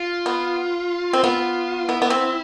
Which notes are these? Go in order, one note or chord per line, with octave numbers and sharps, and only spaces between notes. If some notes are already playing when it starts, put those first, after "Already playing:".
Already playing: F4
B3
C4
B3 F4
B3 E4
B3
C4